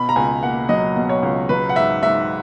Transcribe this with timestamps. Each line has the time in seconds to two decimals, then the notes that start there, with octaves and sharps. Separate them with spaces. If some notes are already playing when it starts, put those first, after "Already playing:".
Already playing: B2 B5
0.09 A#5
0.16 C#2 G#5
0.43 A#3 F#5
0.69 F#3 D#5
0.96 B2
1.09 C#5
1.23 C#2
1.49 F#3 B4
1.69 F#5
1.76 G#2 E5
2.03 G#2 E5